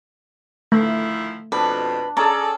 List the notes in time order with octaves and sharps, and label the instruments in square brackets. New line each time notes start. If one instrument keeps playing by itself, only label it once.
[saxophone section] D#3 F3 E4 [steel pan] A3
[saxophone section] F2 B2 [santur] D4 [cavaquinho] B4
[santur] C#4 G#4 A5 [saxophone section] A4 D5 [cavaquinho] A#5